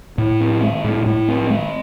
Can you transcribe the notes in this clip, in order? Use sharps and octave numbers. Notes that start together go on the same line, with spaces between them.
A2
C4
G#3
A2
A2
C4
G#3